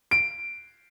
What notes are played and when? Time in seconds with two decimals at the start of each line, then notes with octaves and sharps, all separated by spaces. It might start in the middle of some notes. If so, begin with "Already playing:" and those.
0.11 D7